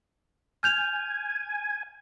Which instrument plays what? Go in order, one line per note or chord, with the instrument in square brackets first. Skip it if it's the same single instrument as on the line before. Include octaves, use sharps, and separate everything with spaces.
[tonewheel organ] G#5 [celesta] F6 G6 F7